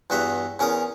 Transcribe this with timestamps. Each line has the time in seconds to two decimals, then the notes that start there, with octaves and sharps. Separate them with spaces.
0.10 E2 G2 F#4 D#5 E5 A#5
0.59 E2 C#4 A#4 A#5 D#6